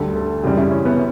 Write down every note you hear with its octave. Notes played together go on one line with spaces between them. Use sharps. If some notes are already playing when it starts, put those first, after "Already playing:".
Already playing: D2 D3 G3 A4
A4
F#2 C#3 E3 G3 G4
E4
C#4
B3